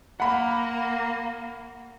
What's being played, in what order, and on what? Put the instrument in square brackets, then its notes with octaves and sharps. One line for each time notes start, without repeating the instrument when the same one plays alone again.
[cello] A#3 [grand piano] F#5 B5